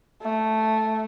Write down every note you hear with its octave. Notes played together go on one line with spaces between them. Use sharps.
A3